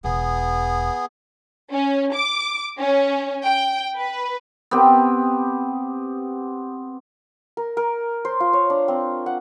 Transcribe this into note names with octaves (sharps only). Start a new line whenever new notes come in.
E1 B3 G#4
C#4
D6
C#4
G5
B4
B3 C4 G4
A#4
A#4
C5
F4
C#5
D4
C4
F#5